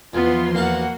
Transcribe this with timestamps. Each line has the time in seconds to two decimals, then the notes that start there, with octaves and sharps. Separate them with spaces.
0.14 E2 E3 F3 B3 F4 C6
0.55 E2 A#3 F#4 F5 F#5 A5